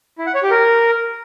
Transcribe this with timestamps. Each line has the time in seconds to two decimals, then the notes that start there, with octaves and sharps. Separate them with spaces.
0.18 E4
0.26 F#5
0.35 C#5
0.43 G4
0.51 A#4